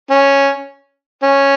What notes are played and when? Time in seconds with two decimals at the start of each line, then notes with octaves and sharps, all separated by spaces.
0.11 C#4
1.23 C#4